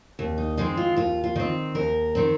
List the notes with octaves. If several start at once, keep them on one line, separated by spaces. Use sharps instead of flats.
D#2
D#4
D#3 G#3 C4 D#4
F4
D#2 F4
F4
D#3 C4
D#2 A#4
D#3 C4